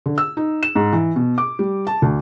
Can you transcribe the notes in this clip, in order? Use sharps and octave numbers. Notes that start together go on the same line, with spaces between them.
D3
E6
D#4
E7
G#2
E3
B2
D6
G3
A5
D2